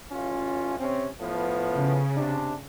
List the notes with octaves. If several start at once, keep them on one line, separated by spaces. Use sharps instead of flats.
A1 C#4 F4
C3 C4 C#4
A2 F3 B3
C#3
C3 D4